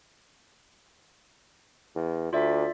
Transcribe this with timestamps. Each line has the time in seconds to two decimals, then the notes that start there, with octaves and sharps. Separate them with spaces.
1.95 E2
2.33 D2 F4 D5 E5